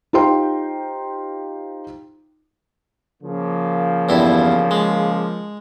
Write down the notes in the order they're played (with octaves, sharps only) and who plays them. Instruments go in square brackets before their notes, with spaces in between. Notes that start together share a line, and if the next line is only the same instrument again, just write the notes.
[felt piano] D#4 F4 G4 C5 G5 C6
[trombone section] C#3 F3 A#3
[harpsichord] E2 G2 E4
G#3